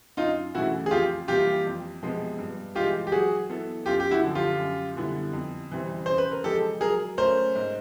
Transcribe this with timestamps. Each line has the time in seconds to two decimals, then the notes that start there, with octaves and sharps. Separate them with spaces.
0.17 F#2 D#4 F4
0.55 C#3 E3 A3 E4 F#4
0.86 G#4
0.91 F2 F4 G4
1.28 C3 E3 G3 A#3 F4 G4
1.66 F2
2.02 C3 F3 G#3 B3
2.38 G2
2.75 E3 G#3 F4 G4
3.07 G4
3.12 F#3 F#4 G#4
3.49 B3 E4 A4
3.86 F#2 F4 G4
4.00 G4
4.11 E4 F#4
4.23 D3 F3
4.35 F4 G4
4.59 F#2
4.96 D3 G3 B3 E4
5.33 F2
5.71 C3 E3 G3 C4
6.06 C#3 C5
6.18 B4
6.31 A#4
6.44 F3 G#3 G4 A4
6.81 F#3 G#4 A#4
7.18 A3 C#4 A#4 C5
7.55 G#2